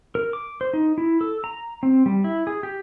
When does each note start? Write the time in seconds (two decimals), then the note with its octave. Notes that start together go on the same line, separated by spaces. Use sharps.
0.15 A#4
0.33 D6
0.61 C5
0.73 D#4
0.98 E4
1.21 A4
1.44 A#5
1.83 C4
2.06 G3
2.24 E4
2.47 G#4
2.63 G4